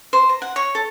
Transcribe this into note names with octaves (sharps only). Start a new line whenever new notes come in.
C5
A#5
F#5
C#5
A4